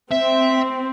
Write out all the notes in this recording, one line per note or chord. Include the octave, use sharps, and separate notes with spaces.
C4 E5